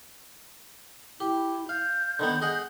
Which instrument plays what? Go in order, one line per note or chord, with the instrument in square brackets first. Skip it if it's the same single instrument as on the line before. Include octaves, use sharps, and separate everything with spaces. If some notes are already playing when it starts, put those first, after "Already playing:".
[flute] E4 [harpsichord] G4
[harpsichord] F5 [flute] G6
[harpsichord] D3 D#3 B3
G#4 D#5 F#5